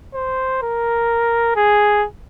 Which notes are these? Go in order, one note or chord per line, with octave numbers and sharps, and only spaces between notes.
C5
A#4
G#4